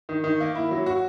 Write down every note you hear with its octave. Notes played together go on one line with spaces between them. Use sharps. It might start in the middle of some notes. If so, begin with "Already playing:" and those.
D#3
D#3
A#3
E4
F#3
F#4